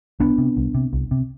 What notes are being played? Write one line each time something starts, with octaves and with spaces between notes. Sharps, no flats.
C2 B3 D4
C3
C2
C3
C2
C3